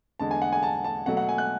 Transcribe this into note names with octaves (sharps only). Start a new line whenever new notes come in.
E2 D3 G#3 A5
G#5
F#5
G#5
A5
A5
B2 F#3 A3 F#5
F#5
G#5
F#6